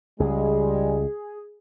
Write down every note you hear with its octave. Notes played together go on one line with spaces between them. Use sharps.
C#2 G3 G#3 G#4